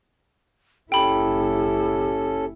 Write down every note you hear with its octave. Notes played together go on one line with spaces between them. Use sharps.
F#1 C#4 E4 G4 A4 G5 B5